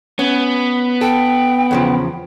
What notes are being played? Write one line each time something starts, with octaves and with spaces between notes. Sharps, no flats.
B3 C#4
A4 G5
E2 C#3 F3